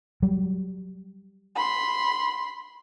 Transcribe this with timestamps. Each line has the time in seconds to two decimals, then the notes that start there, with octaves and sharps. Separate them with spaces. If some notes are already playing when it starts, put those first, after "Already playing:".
0.22 F#3 G3
1.56 B5 C6